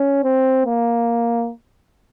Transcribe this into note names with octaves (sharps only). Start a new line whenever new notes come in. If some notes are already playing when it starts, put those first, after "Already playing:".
Already playing: C#4
C4
A#3